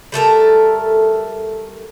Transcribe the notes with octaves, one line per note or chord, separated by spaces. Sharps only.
G3 A3 A4 A#4